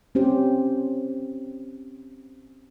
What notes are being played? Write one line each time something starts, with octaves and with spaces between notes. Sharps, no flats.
C4 C#4 G4 C5